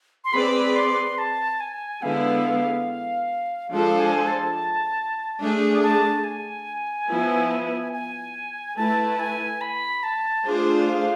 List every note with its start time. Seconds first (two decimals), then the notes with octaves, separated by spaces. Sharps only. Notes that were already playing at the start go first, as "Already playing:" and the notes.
0.24 C6
0.33 C4 G#4 B4 D5 B5
0.76 C6
1.18 A5
1.60 G#5
2.02 D3 G#3 B3 E4 F5
3.71 F3 G#3 D4 A4 C5 F5
3.99 G#5
4.27 A5
5.40 A3 D4 G#4
5.83 A5
6.24 G#5
7.09 F3 B3 E4
7.93 G#5
8.77 A3 E4 B4 A5
9.20 G#5
9.61 B5
10.03 A5
10.45 A3 D4 F4 G#4 C5
10.88 F5